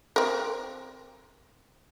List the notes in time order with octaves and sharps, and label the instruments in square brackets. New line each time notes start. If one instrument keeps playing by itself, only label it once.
[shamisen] C4 A#4